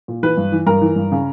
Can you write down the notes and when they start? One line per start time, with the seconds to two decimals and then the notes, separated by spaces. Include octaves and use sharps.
0.08 A#2
0.23 E3 B4
0.37 G2
0.52 E3
0.66 G2 A#4
0.82 E3
0.96 G2
1.12 C#3